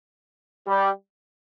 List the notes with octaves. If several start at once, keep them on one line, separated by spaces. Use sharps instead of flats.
G3